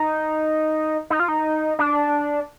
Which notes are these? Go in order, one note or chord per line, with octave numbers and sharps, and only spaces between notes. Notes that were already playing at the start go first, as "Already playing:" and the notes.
Already playing: D#4
D#4
F4
D#4
D4